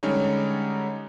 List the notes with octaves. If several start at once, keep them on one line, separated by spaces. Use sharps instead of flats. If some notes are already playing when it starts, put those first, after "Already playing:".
D3 G3 G#3 C#4 D#4 C#5